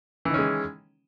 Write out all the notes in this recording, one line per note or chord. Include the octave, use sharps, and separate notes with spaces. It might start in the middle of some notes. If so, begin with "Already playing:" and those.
D#3 E3 G#3 C#4